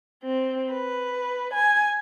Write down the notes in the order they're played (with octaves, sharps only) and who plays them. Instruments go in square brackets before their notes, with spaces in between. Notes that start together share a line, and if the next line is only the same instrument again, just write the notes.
[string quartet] C4
B4
G#5